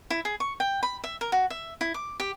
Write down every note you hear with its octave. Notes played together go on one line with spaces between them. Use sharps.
E4
G#4
C#6
G5
B5
E5
A#4
F#4
E5
E4
D6
G4